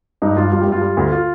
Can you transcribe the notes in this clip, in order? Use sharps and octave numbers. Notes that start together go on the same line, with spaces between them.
G2 D#4
G2 F4
G2 F4
G4
G2
F4
G3
D2
F4